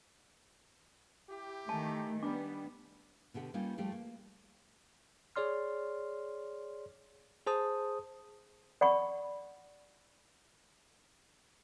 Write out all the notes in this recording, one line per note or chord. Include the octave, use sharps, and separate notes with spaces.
E4 G4
D#3 A3 G#5 A5
G3 B3 D4 D6
B2 D3 G4 F#5
G3 A#3 C#4 D#4 F4 G4
F3 G3 A3 F4 G4
A#3
G#4 C#5 D5 C6 F6
G#4 C5 A5 D#6
D5 F#5 B5 C#6